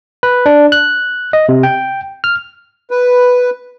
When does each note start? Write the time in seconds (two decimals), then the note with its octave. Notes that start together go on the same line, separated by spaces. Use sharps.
0.23 B4
0.46 D4
0.72 F#6
1.33 D#5
1.49 C3
1.63 G5
2.24 F6
2.91 B4